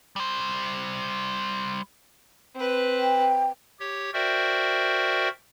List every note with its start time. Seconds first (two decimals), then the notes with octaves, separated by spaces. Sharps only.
0.16 G3 C5
2.55 C4 B4
3.00 G5
3.80 G4 C#5
4.14 F#4 A#4 C5 D5 E5 G5